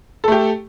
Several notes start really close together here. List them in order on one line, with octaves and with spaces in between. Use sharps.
A4 A3 G4